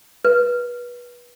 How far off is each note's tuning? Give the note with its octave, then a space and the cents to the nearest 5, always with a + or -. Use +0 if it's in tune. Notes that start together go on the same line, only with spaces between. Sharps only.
B4 -25